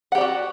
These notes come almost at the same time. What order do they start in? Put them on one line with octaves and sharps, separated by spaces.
F#5 G4 D5 F#4